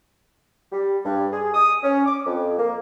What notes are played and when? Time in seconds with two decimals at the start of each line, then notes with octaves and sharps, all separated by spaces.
0.72 G3
1.05 G2
1.33 G#4
1.54 D#6
1.83 C#4
2.06 D6
2.26 F2
2.58 A#3